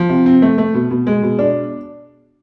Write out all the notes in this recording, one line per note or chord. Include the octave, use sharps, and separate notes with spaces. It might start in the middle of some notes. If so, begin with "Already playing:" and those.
Already playing: F3
C3
C4
A3
A3
B2
B2
G#3
B2
D4